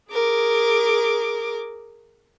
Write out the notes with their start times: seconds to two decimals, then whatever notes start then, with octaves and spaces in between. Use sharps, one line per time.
0.10 G#4 A#4 D6